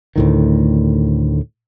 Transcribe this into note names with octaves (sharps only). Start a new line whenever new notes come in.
D2 A2 D#3